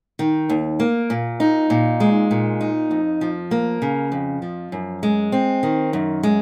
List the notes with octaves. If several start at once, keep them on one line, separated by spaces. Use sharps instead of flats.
D#3
D#2
A#3
A#2
D#4
A#2
G#3
A#2
D#4
F2
F3
A#3
C#3
F2
F3
F#2
G#3
C4
D#3
F#2
G#3